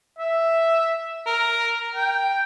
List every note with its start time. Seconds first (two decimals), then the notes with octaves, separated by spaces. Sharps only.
0.18 E5
1.26 A#4
1.95 G5